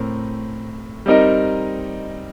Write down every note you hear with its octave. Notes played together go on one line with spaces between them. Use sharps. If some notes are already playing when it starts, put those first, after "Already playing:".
Already playing: A2 A3 C4 A#4
G3 C4 D#4 A#4 D#5